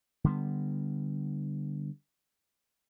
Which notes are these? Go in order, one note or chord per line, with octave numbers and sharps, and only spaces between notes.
D3 G3 B3